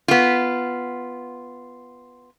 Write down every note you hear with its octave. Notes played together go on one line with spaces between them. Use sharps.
B3 F4